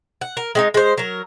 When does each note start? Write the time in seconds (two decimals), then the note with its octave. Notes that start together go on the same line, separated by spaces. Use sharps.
0.21 F#5
0.37 A#4
0.55 G#3 C4 D#4
0.74 G#3 C5
0.98 F#3 A#4